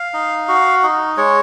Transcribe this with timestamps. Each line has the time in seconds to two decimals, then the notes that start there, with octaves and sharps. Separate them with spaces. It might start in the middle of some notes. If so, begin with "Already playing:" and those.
Already playing: F5
0.14 D#4
0.48 F#4
0.83 D#4
1.17 G#3 C#5